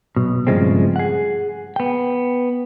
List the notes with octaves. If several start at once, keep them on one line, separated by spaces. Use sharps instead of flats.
B1 B2
G2 C#3 F3 G#3 A3 C4
G#4 F#5
B3 G5